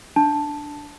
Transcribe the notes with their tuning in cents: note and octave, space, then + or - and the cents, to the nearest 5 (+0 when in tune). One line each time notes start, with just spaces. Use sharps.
D4 +0 A5 +0